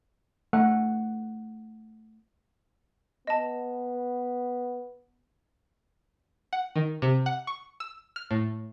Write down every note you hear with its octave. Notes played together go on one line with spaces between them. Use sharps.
A3 F#5
B3 D#5 A5
F#5
D#3
C3
F#5
C#6
E6
F6
A2